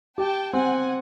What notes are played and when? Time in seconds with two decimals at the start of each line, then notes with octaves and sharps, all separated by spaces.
0.18 G4 G5 A5
0.53 C4 F#5 G#5